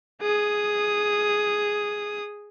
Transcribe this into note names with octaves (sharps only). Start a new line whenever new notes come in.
G#4 D#6